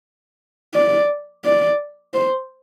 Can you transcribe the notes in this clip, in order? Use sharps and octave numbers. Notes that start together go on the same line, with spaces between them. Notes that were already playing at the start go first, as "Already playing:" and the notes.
D5
D5
C5